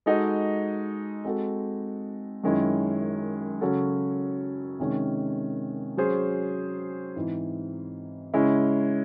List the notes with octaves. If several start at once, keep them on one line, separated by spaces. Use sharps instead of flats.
G#3 D#4 F#4 A4 D#5
G#3 C4 F#4 A4
F#2 D#3 G#3 C#4 E4
C#3 F#3 C#4 F#4 A4
C3 D#3 G#3 C#4
F#3 C#4 G#4 C5
G#2 E3 C4 E4
C#3 G#3 C#4 E4